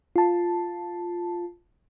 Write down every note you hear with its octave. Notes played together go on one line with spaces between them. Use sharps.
F4 A5